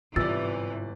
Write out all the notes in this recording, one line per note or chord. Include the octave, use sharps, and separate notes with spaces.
G1 G#2 C3 E3 F4 D5 E6 A6